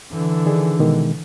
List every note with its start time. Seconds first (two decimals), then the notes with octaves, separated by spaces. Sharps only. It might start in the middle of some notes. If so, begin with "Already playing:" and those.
0.12 D3 E3
0.46 D#3 D4 G#4
0.79 B2 D#3 G#3